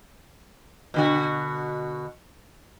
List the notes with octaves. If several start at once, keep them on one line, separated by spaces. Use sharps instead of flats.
B2 D3 F#4